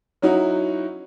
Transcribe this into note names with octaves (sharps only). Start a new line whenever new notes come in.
F#3 C#4 D#4 E4 F#4